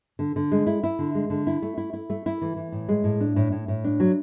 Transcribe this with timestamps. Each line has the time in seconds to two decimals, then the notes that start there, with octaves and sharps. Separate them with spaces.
0.19 D3
0.36 D3
0.52 G#3
0.67 E4
0.84 E4
0.99 D3
1.15 G#3
1.30 D3
1.47 E4
1.62 A3
1.77 E4
1.93 E4
2.10 A3
2.26 E4
2.42 E3
2.57 E3
2.72 A2
2.89 G#3
3.04 A2
3.21 D4
3.36 A2
3.52 A2
3.68 A2
3.84 D4
4.00 F#3